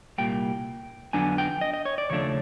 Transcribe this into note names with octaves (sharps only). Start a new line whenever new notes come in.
C2 A#2 G3 A#3 G5
F2 D3 F#3 B3 D4 G#5
G5
D#5
D#5
C#5
D5
D#2 C#3 F3 A3 D4 C#5